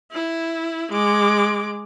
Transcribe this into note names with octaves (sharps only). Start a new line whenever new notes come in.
E4
G#3 D6